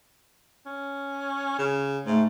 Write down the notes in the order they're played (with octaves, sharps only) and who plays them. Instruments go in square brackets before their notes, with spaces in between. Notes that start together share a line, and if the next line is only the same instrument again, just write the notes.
[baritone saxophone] C#4
C#3
[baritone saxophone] G#2 [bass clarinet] A3